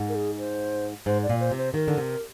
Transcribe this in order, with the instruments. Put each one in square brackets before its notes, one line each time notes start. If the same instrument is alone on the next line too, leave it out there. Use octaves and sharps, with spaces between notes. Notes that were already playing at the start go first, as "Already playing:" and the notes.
Already playing: [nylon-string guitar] G#2
[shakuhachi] A#4
G#4
C5
[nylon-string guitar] G#2 [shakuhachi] C5
[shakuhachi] D5
[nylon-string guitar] A#2
[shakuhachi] C5
[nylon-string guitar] C3
[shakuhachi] C5
[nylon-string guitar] D#3 [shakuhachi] A#4
[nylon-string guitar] D3
C3